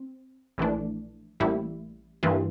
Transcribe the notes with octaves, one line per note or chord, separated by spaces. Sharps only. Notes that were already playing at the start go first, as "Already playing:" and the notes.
Already playing: C4
A#1 A2 E3 A3 D4
A1 A2 G3 A#3 E4
G2 E3 A#3 F4